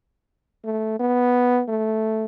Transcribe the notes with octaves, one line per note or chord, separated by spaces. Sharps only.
A3
B3
A3